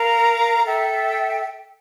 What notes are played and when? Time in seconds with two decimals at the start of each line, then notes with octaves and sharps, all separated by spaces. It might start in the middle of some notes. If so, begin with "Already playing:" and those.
Already playing: A#4 F5 A#5
0.65 A4 E5 G5